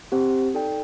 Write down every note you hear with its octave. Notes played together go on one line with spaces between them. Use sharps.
C4 G4 C5 F#5
D#4 A4 D5 G5